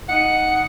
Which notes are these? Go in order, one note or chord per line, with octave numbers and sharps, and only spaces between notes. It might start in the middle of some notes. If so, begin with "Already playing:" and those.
D#4 F#5